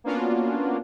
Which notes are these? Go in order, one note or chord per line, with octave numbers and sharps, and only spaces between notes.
A#3 B3 C#4 D4 F4 F#4